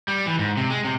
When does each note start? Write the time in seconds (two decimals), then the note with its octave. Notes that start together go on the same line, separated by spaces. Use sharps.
0.08 G3
0.26 E3
0.39 G#2
0.57 C3
0.70 G#3
0.85 C3